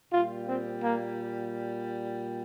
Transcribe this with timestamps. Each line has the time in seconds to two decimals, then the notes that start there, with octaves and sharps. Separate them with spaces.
0.11 A#2 G3 F4
0.47 C4
0.83 A#3